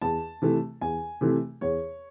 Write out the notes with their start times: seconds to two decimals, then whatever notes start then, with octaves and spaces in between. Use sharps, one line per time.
0.02 E2 A5
0.42 C3 E3 A3
0.81 E2 G#5
1.21 C3 E3 A3
1.61 E2 C#5